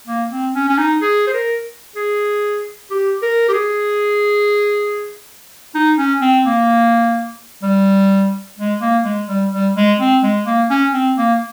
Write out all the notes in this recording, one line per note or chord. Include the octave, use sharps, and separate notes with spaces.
A#3
C4
C#4
C#4
D#4
G#4
C5
A#4
G#4
G4
A#4
G4
G#4
D#4
C#4
C4
A#3
G3
G#3
A#3
G#3
G3
G3
G#3
C4
G#3
A#3
C#4
C4
A#3